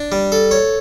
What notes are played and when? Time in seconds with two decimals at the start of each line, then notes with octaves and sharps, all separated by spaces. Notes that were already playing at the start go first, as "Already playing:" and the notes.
Already playing: D4
0.12 G3
0.32 A4
0.51 C#5